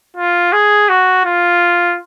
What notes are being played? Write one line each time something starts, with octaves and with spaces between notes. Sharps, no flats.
F4
G#4
F#4
F4